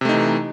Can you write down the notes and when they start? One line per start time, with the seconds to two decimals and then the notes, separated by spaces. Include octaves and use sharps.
0.01 C3
0.05 A3
0.09 D#4
0.13 E3